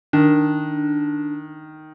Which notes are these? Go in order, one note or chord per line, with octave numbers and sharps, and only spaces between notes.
D#3 D4